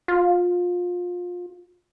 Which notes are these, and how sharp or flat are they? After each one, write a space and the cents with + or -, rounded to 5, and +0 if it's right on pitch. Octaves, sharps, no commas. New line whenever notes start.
F4 +25